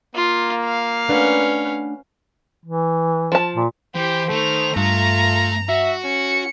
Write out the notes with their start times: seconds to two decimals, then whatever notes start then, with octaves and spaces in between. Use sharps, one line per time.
0.15 A#3 F4
0.65 F5
1.08 A3 C#4 D4 B4 F#5
2.65 E3
3.32 F3 A5
3.55 A#2
3.96 E3 G4 C5
4.30 D#3 A3 F7
4.76 G2 A3 F4 A#5
5.69 F#4 E5
6.04 C#4 C#7